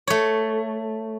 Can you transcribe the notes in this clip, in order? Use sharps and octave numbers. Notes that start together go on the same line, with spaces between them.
A3 C#5